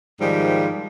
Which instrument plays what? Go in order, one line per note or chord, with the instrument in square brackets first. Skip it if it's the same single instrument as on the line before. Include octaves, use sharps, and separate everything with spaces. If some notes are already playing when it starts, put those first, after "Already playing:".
[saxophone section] G#2 D#3 F3 G3